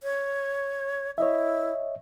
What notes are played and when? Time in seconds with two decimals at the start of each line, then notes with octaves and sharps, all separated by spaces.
0.03 C#5
1.18 E4 C#5 D#5 E5